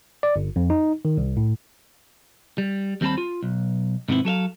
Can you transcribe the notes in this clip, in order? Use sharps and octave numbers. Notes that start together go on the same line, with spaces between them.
D5
G1
F2
D#4
D#3
C2
A2
G3
D#2 G3 C4 E4 A5 B5
F4
B1
G#2 C3 D#3 B3 C4 E4
F#3 A4 E5 F5